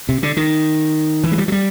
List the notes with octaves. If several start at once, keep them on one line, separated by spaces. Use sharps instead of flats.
C3
D3
D#3
E3
G#3
G3
F#3
G3